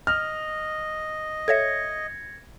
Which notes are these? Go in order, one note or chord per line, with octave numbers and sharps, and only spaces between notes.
D#5 F6
A4 C#5 E5 G#6 A#6 C#7